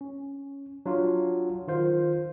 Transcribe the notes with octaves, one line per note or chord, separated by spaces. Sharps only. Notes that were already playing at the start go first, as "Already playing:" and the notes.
C#4
F#3 D4 F4
D#3 F4 C5